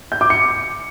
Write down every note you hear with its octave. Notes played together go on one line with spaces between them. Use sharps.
G6
D6
C#7